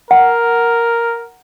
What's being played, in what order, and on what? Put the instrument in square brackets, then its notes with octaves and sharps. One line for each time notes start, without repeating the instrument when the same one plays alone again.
[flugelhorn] A#4 [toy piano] F#5